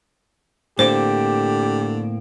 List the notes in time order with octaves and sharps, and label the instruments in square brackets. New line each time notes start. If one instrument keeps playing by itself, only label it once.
[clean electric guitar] A2 A#3 C4 [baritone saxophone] D3 [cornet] G4 [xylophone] C5